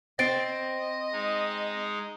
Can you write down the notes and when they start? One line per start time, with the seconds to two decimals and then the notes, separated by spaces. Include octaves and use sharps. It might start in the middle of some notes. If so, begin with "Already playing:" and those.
0.19 C4 D#5 A6 C7 D7
1.12 G#3 D#4